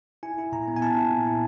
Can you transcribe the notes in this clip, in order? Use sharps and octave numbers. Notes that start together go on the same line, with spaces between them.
E4 G#5
E4
A#2 A#5
B3
G#5
E4 A5
E4
A#2
E4